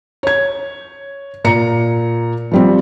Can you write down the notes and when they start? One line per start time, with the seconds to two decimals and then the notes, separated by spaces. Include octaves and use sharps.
0.23 C#5 G#6
1.44 A#2 A#5 C#7
2.51 F3 G3 C4